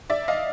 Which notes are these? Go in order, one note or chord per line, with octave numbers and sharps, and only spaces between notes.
D5 E5
D#5 F5